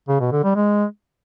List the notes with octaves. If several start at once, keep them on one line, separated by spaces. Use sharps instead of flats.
C#3
B2
D3
G3
G#3